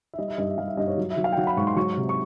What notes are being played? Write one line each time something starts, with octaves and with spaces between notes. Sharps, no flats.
E5
G3 D#5
E5
G2 D#5
E5
G3 F5
E5
G2 D#5
C#5
F#3
E5
F#3
F5
G5
F#3 F#5
B5
G#2 C#6
C6
F#3 C#6
C3
C#6